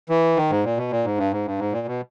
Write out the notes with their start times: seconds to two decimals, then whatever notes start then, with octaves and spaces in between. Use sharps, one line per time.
0.09 E3
0.37 D#3
0.50 G#2
0.64 A#2
0.77 B2
0.91 A#2
1.04 G#2
1.18 G2
1.32 G#2
1.46 G2
1.59 G#2
1.72 A#2
1.87 B2